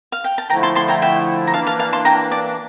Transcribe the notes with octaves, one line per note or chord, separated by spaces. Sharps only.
F5
G5
A5
D3 F3 A3 E4 G5 A#5
A5 C6
A5 C6
G5 A#5
E5 G5
A#5
E3 A#3 D4 F5 A5
F5 A5
F5 A5
A5 C6
G5 A#5
D5